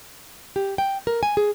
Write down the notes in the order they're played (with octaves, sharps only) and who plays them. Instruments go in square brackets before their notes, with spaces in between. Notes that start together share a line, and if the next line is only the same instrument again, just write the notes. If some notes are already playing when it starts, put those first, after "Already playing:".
[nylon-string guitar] G4
G5
A#4
G#5
G#4